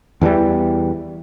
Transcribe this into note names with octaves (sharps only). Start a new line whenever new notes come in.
E2 E3 F#3 G3